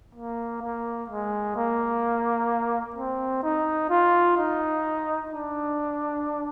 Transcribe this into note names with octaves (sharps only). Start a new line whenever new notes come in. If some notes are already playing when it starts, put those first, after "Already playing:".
A#3
A#3
G#3
A#3
C4
D#4
F4
D#4
D4